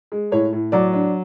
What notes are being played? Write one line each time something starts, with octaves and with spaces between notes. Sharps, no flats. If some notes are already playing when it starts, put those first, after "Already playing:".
G#3
A2 C#5
A2
F#3 D5
D4